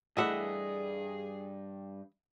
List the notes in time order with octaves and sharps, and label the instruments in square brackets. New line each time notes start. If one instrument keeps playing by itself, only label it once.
[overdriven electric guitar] G2 [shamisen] E3 G#3 A3 [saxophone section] G#4 [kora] D#5 E5 F#5